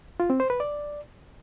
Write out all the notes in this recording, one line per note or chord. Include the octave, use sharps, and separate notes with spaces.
F4
C4
C5
B4
D5